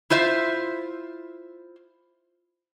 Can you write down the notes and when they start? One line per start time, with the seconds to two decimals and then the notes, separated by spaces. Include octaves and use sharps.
0.10 E4 F4 C5 E5